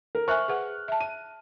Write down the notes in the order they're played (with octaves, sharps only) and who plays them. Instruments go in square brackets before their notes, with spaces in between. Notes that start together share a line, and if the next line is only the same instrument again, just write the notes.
[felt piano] A#4
[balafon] C5 E5 G#5 [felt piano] C#6 F6 F#6
[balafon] G#4 B4 F#5
E5 A5
[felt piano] D#7